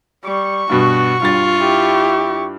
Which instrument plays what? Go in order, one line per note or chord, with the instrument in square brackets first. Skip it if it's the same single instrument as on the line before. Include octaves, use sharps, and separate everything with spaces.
[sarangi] G3 [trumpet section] C#6
[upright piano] G2 B2 [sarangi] F#4
[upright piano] G2 A6 [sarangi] F4
[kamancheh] E4 G4